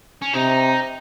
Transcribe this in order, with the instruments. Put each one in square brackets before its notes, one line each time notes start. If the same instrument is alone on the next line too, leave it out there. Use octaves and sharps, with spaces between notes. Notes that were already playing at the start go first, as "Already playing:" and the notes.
[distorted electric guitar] C#4
[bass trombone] C3 [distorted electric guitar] D#4